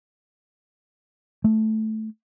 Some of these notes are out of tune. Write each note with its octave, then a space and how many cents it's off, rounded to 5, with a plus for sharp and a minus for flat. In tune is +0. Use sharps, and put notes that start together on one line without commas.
A3 -10